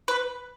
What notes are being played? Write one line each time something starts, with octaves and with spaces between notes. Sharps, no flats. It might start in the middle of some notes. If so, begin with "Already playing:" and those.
B4